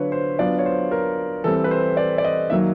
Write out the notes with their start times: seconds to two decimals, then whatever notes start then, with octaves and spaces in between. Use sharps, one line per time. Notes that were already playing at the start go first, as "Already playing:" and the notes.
Already playing: D3 F#3 B3 D4 F4 B4 C#5
0.12 C5
0.39 F#3 B3 D4 F4 D5
0.59 C#5
0.66 C5
0.91 A#4
1.44 E3 G3 C4 A4
1.64 B4
1.71 C5
1.97 D5
2.18 D5
2.24 D#5
2.50 D#3 F#3 A#3 D#4 E5